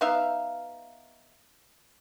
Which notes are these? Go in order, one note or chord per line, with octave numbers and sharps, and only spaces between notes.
B3 D#4 E5 F5